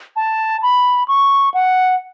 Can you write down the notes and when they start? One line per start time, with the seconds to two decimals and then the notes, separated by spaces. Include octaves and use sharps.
0.16 A5
0.62 B5
1.08 C#6
1.54 F#5